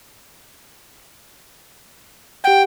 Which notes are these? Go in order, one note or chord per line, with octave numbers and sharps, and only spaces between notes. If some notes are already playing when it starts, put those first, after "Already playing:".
G4 F#5 G5